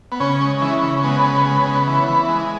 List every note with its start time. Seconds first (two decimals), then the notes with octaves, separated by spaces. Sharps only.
0.12 B3
0.20 C#3 C#4
0.41 G#3
0.62 E3 C#4
0.83 C#3
1.04 G#3 B3
1.24 C#3
1.46 G#3
1.66 C#3
1.87 E3
2.08 E3
2.29 G#3